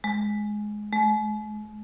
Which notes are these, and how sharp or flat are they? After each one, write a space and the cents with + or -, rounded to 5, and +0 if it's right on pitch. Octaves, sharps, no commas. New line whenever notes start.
G#3 +10
G#3 +45